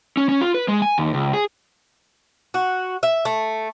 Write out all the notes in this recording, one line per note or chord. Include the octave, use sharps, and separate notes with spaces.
C#4
C#4
F4
B4
G#3
G#5
D#2
C#2
G#4
F#4
E5
A3